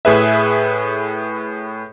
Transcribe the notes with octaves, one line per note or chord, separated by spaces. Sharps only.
A2 G#4 B4 E5